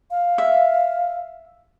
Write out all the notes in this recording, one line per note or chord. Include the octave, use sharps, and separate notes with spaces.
F5
E5